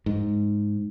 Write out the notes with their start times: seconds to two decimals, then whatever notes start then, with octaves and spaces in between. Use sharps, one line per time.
0.06 G#2